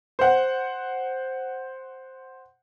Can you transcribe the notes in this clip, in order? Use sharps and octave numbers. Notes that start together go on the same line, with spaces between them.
C5 F#5